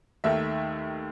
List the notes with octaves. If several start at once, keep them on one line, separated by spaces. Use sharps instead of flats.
D#2 D#3 A3 E5